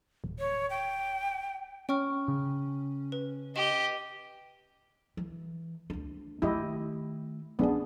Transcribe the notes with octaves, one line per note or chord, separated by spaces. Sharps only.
D1
C#5
G5
C#4 G5 C#6 F6
C#3
B4
G4 D#5 E7
E3
D2 D4
D#3 A3 E4 G4 D#5
E3 B3 C#4 D4 G#4